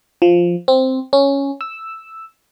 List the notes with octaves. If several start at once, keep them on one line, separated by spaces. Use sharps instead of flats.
F3
C4
C#4
E6